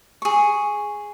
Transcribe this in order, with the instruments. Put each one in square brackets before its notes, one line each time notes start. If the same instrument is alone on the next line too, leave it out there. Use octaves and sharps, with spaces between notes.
[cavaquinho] G#4 C#6